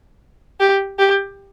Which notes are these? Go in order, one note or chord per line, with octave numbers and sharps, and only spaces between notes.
G4
G4